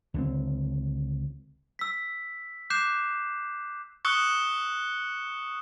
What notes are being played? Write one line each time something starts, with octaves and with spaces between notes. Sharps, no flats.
C#2 D3 G#3 C4
E6 B6
D6 F#6 G6 C7 E7
C#6 D#6 E6 F#6 C#7